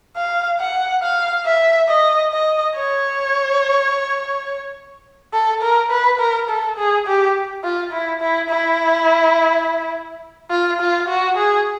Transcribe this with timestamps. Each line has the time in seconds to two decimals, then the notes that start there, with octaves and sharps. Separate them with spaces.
0.16 F5
0.60 F#5
1.02 F5
1.46 E5
1.89 D#5
2.32 D#5
2.75 C#5
5.34 A4
5.62 A#4
5.91 B4
6.19 A#4
6.49 A4
6.78 G#4
7.07 G4
7.63 F4
7.93 E4
8.21 E4
8.50 E4
10.51 F4
10.80 F4
11.09 F#4
11.37 G#4